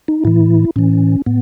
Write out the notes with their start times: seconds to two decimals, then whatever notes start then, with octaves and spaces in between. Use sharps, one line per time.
0.08 D#4
0.25 A2 E3 E4
0.76 A2 E3 C#4
1.26 A2 B3